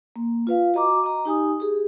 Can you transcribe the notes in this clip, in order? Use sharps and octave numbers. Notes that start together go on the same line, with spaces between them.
A#3
F4 B4 F5
F#4 D#5 A#5 D6
D#5 A#5
D#4 G4 G#5 D#6
G4 G#4